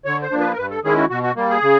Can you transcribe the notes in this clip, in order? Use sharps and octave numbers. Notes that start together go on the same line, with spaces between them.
D3 C#5
C5
F3 A#3 D4
B4
A#4
G2 B4
A4
D#3 G#3 C#4 E4 G#4
F#4
B2 F#4
F#4
G3 A#3
G#4
C#3